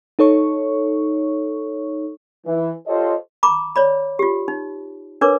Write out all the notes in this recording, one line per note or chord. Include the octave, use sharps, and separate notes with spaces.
D#4 A4 C#5 C#6
E3
F4 G4 A4 C5 C#5 D#5
A#5 B5 D6
C#5 D5 B5
F4 G4
D#4
D4 A#4 B4 C#5 D6